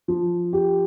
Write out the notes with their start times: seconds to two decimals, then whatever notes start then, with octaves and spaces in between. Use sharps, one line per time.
0.08 F3
0.53 G4